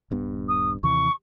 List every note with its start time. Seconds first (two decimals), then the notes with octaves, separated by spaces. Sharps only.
0.11 D#1 G2 B3
0.48 D#6
0.83 D#2 C3 E3 C#6